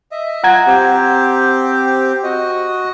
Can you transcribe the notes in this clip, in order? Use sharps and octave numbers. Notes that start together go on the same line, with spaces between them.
D#5 E5
F4 F#5 A#5 G#6
C4 G4
F#4 D#5